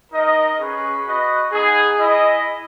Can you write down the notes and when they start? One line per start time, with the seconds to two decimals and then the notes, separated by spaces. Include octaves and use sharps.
0.11 D#4 A#4 D#5
0.58 C#4 G#4 B4
1.05 F#4 B4 D#5
1.52 B3 D#4 G#4
1.98 E4 G#4 D#5